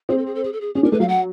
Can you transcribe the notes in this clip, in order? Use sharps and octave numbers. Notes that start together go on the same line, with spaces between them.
C4 G#4
A4
G#4
A4
G#4
A4
G#4
C#4 G#4
D4 A#4
A3 B4
F#3 F5
F#5